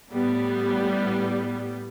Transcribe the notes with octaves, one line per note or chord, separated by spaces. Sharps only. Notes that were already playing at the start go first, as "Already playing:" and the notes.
A2 G3 B3